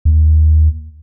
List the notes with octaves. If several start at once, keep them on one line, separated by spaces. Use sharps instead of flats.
D#2